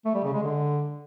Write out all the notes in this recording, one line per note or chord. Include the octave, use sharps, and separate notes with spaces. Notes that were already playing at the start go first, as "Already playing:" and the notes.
A3
G3
C#3
G#3
D3